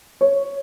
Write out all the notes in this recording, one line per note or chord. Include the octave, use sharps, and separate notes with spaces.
C#5